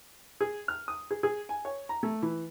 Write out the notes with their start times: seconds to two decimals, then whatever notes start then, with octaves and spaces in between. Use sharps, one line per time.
0.41 G#4
0.68 F6
0.88 D#6
1.11 G#4
1.23 G#4
1.49 G#5
1.65 C#5
1.89 A#5
2.03 A3
2.22 E3